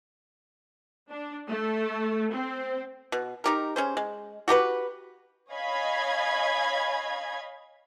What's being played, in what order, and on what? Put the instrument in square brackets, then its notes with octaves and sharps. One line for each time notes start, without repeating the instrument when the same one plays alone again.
[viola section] D4
A3
C4
[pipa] B2
D#4 G4 A#4
C#4 G#4 C5
G#3
F#4 G4 A#4 B4
[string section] C#5 D#5 F5 G#5 B5 G#6